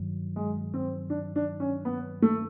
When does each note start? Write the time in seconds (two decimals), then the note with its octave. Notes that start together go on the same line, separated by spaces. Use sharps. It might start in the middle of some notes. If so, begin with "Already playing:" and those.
Already playing: G2 D#3 F#3
0.36 G#3
0.74 C4
1.10 D4
1.36 D4
1.60 C#4
1.85 B3
2.22 A3